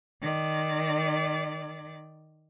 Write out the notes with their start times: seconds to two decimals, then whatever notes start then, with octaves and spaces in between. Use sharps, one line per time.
0.21 D#3 D5